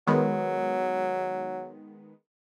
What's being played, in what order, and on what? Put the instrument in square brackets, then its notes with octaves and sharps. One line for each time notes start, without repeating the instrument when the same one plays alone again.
[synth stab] D#3 G#3 B3 [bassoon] F#3